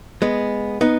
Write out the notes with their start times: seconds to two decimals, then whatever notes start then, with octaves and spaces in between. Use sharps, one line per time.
0.22 G#3 B3
0.81 B3 D#4